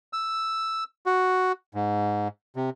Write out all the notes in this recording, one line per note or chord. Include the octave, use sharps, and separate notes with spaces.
E6
F#4
G#2
C3